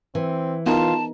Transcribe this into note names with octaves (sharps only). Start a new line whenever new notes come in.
E3 C4
B3 D#4 F4 A#4 A5